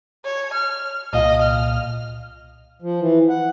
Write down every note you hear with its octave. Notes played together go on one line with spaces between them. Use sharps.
C#5
F6
C2 A#2 D#5 F5
F6
F3
E3
F#5